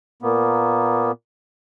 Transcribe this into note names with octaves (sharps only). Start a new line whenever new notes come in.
A#2 A#3 B3